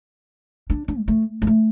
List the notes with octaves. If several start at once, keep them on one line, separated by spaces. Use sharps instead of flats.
D4
D4
G3
A3
G3
A3